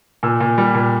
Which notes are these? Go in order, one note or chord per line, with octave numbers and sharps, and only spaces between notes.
A#2 E6
A#2
G3
A#2